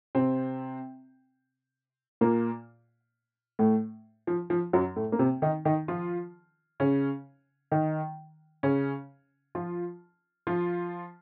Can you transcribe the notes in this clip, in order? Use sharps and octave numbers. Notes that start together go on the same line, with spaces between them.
C3 C4
A#2 A#3
A2 A3
F3
F3
F#2 F#3
A2 A3
A#3
C3 C4
D#3 D#4
D#3 D#4
F3 F4
C#3 C#4
D#3 D#4
C#3 C#4
F3 F4
F3 F4